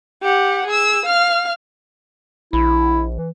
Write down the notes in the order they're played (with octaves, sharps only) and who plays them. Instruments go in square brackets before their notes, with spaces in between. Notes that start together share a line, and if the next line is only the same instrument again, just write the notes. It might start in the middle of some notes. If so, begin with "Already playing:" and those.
[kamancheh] G4 F#5
G#4 E6
F5 F6
[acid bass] A#1 [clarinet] E4
[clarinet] E3